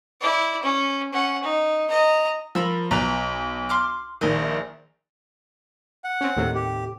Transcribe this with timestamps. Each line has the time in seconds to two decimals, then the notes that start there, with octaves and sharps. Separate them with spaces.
0.21 E4 D5
0.63 C#4
1.13 C#4 F#5
1.43 D#4
1.90 D#5 A#5
2.55 F3 A#4 B5 E6
2.91 B1 B4 D#5 A#5
3.69 C6 D6 F6
4.21 A#1 D#3 E4 D#5
6.04 F#5
6.21 C4 C#4
6.37 D#2 A2 C3
6.54 G4